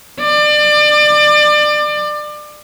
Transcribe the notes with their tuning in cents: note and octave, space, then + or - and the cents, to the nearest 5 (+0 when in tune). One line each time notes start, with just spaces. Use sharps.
D5 +30